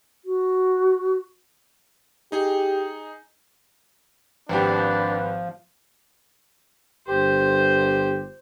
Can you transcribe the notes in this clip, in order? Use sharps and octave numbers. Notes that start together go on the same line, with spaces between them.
F#4
D#4 G4 G#4
G#1 F3 D4 G4 B4
G1 G4 C5